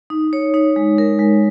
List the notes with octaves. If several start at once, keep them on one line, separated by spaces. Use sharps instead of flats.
D#4
C#5
D#4
G#3
A#4
G#3